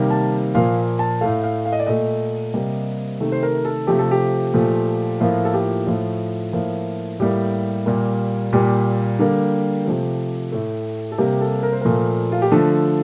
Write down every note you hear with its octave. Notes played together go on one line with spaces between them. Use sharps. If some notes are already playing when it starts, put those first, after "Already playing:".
Already playing: C3 D#3 G3 A#3
A5
A#2 F3 A#3 F5
A5
A2 A3 F5
F5
F5
D#5
D5
A#2 A3 D#5
C3 G3 A#3
C3 D#3 A3
C5
A#4
A4
C3 F3 A3 G4
A4
G4
A#2 F3 A3
A2 F3 A#3 F4
A4
G4
A2 F3 A3 F4
A2 F3 A#3 F4
A2 G3 A#3 G4
A#2 G3 A#3
A#2 G3 A#3 G4
D3 G3 A#3
C3 F3 A3
A2 A3
A4
C3 G3 A#3 G4
A4
A#4
C5
A#2 F3 A3 A#4
F4
G4
D3 F3 A3 A4